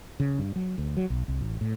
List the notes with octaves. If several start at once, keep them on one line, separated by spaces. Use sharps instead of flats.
C#3
G2
F#3
D2
F#3
B1
C2
A1
A2